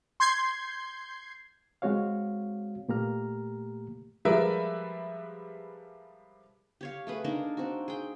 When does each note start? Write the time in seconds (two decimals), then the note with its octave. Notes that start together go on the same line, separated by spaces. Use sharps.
0.20 C6 G6 G#6 C7
1.82 G#3 C4 F#4 C#5 F5
2.89 A#2 A3 A#3 G4 A#5 F6
4.25 F3 G3 G#3 A#4 B4 E5
6.81 G4 C#5 F5
7.07 A3 G#4 B4
7.24 A#3 D4 D#4 A#4
7.57 C4 F#4
7.88 G#4 G5